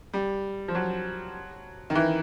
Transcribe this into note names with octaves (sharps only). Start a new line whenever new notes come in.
G3
F3
F#3
D#3
E3